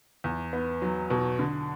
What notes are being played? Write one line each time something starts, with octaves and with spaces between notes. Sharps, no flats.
E2
B3
F#3
B2
D3